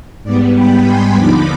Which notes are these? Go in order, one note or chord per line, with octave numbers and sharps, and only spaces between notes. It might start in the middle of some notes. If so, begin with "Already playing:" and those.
G#2 G3 B3 D5
G5 B5
G#5 C6
D#2 D3 F3 B3 D#4 B5 D6